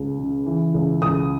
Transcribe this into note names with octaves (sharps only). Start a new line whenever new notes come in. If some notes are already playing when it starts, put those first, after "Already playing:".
Already playing: C#2
C#3
E3
C#2
C#2 D#6